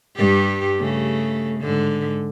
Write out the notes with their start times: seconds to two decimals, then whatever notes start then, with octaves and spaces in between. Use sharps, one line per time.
0.16 G2 G3 G4
0.79 C#3 A3
1.61 G#2 D3